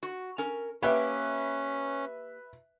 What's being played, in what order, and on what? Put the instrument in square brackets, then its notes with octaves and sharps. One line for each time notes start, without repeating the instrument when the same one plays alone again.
[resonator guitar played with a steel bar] F#4
C#4 A#4
[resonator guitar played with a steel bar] A#3 G4 G5 [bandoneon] C#4 [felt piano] B4 E5